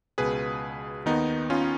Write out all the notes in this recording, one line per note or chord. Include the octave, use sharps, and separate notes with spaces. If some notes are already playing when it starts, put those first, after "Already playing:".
C#2 B2 G#4 B4
D#2 D#3 B3 D#4
C#4 F4